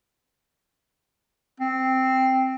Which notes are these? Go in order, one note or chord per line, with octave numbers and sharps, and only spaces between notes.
C4